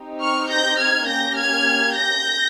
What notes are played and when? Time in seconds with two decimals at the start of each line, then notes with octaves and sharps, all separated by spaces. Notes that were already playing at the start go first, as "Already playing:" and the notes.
Already playing: C4 D#4 G4
0.21 C#6 F6
0.50 G6 A#6
0.78 F6 G#6
1.07 A#3 C#4 G4 G6 A#6
1.36 F6 G#6
1.93 G6 A#6